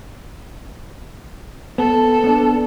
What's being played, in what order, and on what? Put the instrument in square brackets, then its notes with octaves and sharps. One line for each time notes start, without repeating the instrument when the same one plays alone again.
[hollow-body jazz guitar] B3 [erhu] A4
[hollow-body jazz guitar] B3 D4